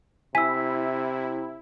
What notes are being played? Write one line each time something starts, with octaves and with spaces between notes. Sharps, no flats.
C3 E4 G#5 E6 B6